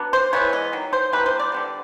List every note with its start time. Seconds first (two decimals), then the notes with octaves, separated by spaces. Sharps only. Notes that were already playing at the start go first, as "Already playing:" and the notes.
Already playing: F#3 B3 D4
0.13 C5
0.33 E3 G#3 B3 C#5
0.53 D#5
0.73 D#3 F#3
0.93 C5
1.12 E3 G3 A#3 D4 B4
1.26 C5
1.39 D5
1.52 D3 G3 B3